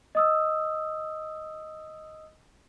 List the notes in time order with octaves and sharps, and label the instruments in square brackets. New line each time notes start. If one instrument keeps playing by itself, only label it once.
[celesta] D#5 D#6 E6